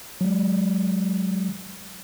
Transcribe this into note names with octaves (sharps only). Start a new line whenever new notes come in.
F#3 G#3